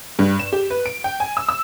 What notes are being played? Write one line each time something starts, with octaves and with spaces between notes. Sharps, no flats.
G2
E7
G4
B4
D7
G5
G#5
E6
E6